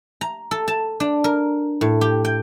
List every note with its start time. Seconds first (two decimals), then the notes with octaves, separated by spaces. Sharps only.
0.21 A#5
0.51 A4
0.68 A5
1.00 D4
1.24 A#4
1.81 A2
2.01 G4
2.25 G5